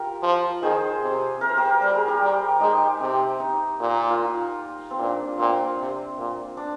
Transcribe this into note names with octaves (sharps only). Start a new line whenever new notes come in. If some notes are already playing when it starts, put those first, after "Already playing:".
Already playing: F4 G4 A#4
F3
D#3 G#4 C5
C3
A#4
C5
G4 A#4
G3 A#4
G#4
G4 A#4
G3
G#3 D#4 G4
C3
D#4
A#2
F4
D#4
C4
A#2 D4
A#2 C4
C3
A#2
D4